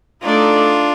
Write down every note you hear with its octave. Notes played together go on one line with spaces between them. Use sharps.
A3 D4 D#4 F4 A4 D5